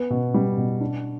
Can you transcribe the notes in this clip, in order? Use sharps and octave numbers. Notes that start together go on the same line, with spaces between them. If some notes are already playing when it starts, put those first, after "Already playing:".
Already playing: B3
B2
G3
B2
D4